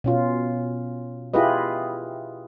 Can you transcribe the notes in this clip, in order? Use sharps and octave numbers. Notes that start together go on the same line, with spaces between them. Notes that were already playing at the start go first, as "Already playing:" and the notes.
B2 C#4 F4
E4 F4 G4 G#4 B4 D#5